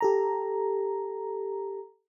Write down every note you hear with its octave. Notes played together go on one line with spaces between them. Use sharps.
G4 A4 A#5